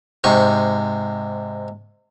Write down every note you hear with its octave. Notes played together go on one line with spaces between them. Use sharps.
G#2 C3 C#6